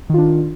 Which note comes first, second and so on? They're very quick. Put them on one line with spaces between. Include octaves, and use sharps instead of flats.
D#3 F4 D4